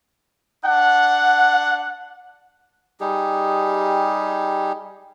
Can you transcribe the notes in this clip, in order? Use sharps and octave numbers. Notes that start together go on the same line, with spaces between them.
D4 F#5
G3 D#4 G4 G#4